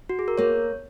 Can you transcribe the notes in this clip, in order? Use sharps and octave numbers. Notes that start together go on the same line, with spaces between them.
F#4
G#4
A#4
A#3 C#5